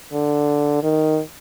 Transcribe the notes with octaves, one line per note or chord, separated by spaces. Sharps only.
D3
D#3